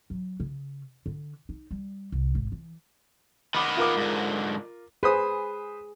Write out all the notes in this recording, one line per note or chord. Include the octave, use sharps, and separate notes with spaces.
F#3
C#3
D3
D#4
G3
C2
G#1
E3
D#3 B3 B5 D6
F4 A#4 D6
G#2 D3
G#4 B4 C5 D#6